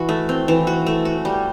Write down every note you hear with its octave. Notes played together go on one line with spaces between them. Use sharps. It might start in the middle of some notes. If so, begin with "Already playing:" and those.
Already playing: E3 F#4
A3
C4
E3
F#4
A3
F#4
G3